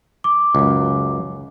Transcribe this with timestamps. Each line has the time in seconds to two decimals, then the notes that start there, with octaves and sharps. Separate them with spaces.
0.24 D6
0.55 C#2 F#2